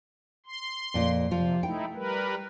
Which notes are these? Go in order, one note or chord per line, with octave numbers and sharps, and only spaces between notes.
C6
F2 A#2 F4
C3 F3 F4
A3 D#4 E4 G5
G3 A#4 B4